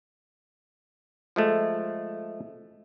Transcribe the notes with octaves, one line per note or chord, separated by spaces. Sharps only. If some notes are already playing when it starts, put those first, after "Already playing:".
F3 G#3 A3